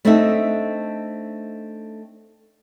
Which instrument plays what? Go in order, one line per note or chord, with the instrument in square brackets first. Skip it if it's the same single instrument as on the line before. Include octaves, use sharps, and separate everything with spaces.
[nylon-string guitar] A3 C4 D4 D#4 A4 E5